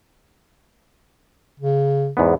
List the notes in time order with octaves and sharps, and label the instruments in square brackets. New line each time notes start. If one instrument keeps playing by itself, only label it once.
[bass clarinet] C#3
[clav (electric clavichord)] E2 G#2 B3